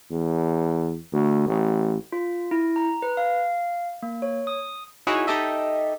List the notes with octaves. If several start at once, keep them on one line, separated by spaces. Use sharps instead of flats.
E2
D2
A1
F4
E4
A#5
B4
F5
A#3
C#5
D#6
D#4 E4 F#4 G#4 C#5
D#4 G4 A4 D#5 E5